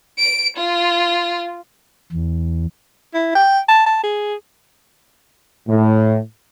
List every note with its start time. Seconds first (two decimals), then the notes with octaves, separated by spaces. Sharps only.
0.19 D7
0.57 F4
2.12 E2
3.14 E4
3.35 G5
3.68 A5
3.86 A5
4.03 G#4
5.67 A2